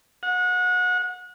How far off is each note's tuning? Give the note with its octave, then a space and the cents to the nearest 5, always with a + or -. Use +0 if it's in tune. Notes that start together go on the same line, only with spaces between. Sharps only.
F#5 -30